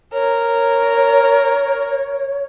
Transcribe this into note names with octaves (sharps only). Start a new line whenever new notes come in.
A#4 C#5